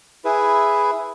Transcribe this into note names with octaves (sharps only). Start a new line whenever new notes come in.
E4 G#4 B4